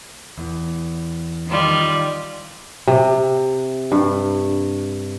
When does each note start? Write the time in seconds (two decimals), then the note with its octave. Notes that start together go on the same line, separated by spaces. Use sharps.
0.38 E2
1.48 D#3 G3 F4
2.87 C3
3.92 G2